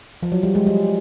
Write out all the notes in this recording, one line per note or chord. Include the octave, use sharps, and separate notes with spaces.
F3
F#3
G3
G#3
G3